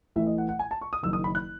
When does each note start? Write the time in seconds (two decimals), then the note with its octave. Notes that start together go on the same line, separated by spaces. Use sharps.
0.16 A1 A2 E3 A3 E4 E5
0.26 D#5
0.38 F#5
0.49 F#5
0.59 G#5
0.71 A5
0.81 C#6
0.93 D#6
1.03 F#1 F#2 D#3 E6
1.13 D#6
1.24 B5
1.35 F#6